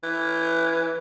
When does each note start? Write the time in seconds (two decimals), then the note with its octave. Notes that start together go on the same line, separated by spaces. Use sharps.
0.03 E3